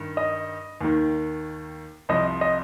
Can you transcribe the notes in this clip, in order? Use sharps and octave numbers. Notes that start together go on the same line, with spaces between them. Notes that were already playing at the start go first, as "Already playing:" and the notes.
Already playing: G2 D#3
D#5
D#2 D#3
C2 C3 F3 D#5
D#5